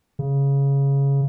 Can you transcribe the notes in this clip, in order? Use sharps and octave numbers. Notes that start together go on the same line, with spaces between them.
C#3